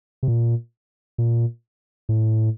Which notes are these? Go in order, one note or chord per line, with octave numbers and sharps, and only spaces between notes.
C3
A#2
A#2
A2